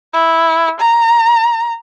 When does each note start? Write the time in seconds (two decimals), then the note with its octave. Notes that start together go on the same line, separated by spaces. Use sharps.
0.13 E4
0.80 A#5